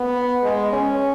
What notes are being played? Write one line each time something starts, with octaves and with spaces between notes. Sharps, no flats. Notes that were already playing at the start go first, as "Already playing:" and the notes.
Already playing: B3
G#3
C#4